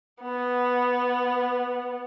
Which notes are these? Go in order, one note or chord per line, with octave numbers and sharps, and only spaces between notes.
B3